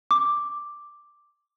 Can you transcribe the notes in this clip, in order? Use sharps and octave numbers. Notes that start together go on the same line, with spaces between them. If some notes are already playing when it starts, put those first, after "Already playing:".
D6